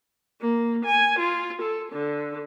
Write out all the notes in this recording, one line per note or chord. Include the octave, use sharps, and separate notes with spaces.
A#3
G#5
F4
A4
D3